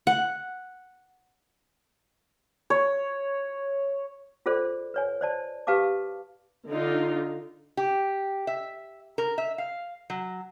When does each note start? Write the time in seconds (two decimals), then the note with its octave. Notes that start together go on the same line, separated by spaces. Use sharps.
0.07 F#5
2.70 C#5
4.46 F4 G#4 A4 C5 D5
4.94 B4 C#5 G#5
5.21 C5 D5 A5
5.67 G4 B4 F5 A5 D6
6.69 D3 D#4 F4
7.77 G4
8.47 E5
9.18 A#4
9.38 E5
9.58 F5
10.10 F#3